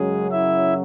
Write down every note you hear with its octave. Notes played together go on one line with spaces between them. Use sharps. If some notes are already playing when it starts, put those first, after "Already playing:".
Already playing: F#2 C#3 F#3 G#3 G#4
E4 E5